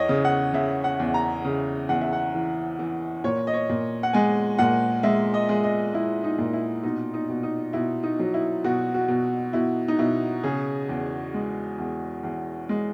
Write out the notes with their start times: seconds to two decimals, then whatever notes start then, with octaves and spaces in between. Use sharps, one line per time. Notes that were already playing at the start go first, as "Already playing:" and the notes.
Already playing: E2 C#5 D#5
0.09 C#3
0.25 F#5
0.53 C#3 E5
0.84 F#5
1.00 E2
1.14 A#5
1.44 C#3
1.89 E2 F#5
2.01 E5
2.13 F#5
2.34 E3
2.79 E3
3.24 A#2 C#5
3.47 D#5
3.54 C#5
3.70 A#2
4.03 F#5
4.13 G#3 G#5
4.58 A#2 F#5
5.03 G#3 E5
5.34 D#5
5.49 G#3
5.64 D#5
5.94 G#3 E4
6.24 D#4
6.38 A#2
6.53 E4
6.83 B2 D#4
7.14 D#4
7.29 B2
7.43 D#4
7.73 B2 E4
8.04 D#4
8.19 F#3
8.34 E4
8.64 B2 F#4
8.94 F#4
9.08 B2
9.53 B2 E4
9.88 D#4
9.99 B2 E4
10.44 C#3 G#4
10.89 E2
11.34 G#3
11.79 E2
12.23 E2
12.69 G#3